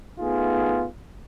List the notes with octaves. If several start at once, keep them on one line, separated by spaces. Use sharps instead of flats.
A3 B3 D#4 F4 G#4